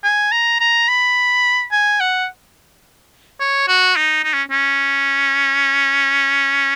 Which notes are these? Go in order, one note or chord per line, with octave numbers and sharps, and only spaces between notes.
G#5
A#5
A#5
B5
G#5
F#5
C#5
F#4
D#4
D#4
C#4
C#4